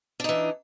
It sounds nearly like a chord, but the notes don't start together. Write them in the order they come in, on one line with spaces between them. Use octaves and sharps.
D4 D#4 E3